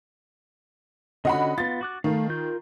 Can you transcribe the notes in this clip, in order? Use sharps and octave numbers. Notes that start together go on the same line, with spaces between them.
D3 C#4 F#4 D#5 F#5 B5
B3 F4 A6
F#4 D6 F#6
D#3 A3 F5
F4 A#4 G6